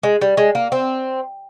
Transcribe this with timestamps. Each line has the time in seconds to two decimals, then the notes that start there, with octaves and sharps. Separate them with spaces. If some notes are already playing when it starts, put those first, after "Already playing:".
0.03 G#3
0.21 G3
0.37 G#3
0.55 A#3
0.72 C4